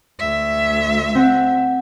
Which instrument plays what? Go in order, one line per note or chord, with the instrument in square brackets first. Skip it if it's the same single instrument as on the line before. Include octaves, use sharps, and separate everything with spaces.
[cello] D2 E5
[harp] C4 F#5